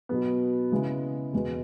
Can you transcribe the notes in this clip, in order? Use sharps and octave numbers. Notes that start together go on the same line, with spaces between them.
B2 F#3 B3
C#3 G#3 B3 E4
E2 B2 G#3 B3